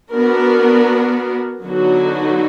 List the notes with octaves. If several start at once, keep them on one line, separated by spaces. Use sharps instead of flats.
B3 D4 F#4 A#4
D3 F#3 B3 D#4 F#4